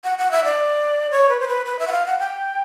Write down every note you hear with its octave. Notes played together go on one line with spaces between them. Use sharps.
F#5
F#5
E5
D5
C#5
B4
C5
B4
B4
E5
F#5
F5
F#5
G5